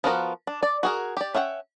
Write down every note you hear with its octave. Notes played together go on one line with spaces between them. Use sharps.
F3 B3 F4 F#4 A#4
D4
D5
F#4 G#4 A#4
G4 D5
C#4 E5 F#5 G5